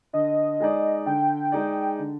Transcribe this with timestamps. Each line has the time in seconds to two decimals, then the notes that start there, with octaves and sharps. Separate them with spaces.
0.13 D3 D#5
0.60 G#3 D#4 G#4 D5
1.06 D3 G5
1.52 G#3 D#4 G#4 D5
1.99 D3